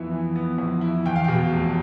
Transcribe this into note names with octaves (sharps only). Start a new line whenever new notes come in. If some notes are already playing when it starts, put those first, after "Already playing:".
Already playing: F2 E3 B3 E4
E3
B3
F2
E4
E2 G5
F5
B2 G5
F1